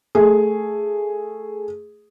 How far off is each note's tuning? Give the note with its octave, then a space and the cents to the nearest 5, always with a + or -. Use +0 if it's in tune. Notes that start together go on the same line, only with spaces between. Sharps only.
A3 +0 G#4 +0